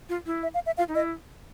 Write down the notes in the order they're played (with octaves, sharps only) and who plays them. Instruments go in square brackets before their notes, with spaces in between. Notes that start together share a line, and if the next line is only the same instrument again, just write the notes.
[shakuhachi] F4
E4
[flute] E5
F5
E5
[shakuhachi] F4 [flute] F5
[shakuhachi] D#4
[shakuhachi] E4 [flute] D#5